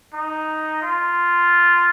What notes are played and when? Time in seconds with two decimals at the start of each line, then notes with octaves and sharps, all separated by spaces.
0.13 D#4
0.82 F4